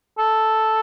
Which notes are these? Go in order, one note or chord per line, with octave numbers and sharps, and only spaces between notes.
A4